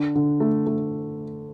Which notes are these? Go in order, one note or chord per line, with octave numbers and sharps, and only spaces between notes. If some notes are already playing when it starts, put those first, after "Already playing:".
Already playing: D3 D4
D3
A3
A3